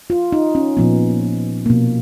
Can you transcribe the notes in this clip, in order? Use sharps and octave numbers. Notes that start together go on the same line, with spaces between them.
F4
D#4
C#4
A#2 F3 B3
B2 A#3